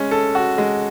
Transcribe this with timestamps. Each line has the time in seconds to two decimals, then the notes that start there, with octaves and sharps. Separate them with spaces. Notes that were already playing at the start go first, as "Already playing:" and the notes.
Already playing: G#3 C#4
0.11 A4
0.35 F#4
0.58 G#3